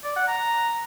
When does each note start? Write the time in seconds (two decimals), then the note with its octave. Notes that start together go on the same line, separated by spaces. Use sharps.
0.04 D5
0.16 F#5
0.28 A#5